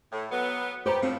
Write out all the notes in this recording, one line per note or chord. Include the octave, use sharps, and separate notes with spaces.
A2
F#3 B3
B3 G4 C5 A#5
A2 F3 C4